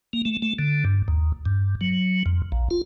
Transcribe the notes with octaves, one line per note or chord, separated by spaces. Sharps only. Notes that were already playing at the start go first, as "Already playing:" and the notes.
A#3
A3
A3
D3
G2
D#2
G2
F#3
F2
A#1
F4